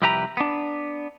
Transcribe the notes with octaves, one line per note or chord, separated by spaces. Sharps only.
C2 F2 E4 G4 B4 A#5
B3 D4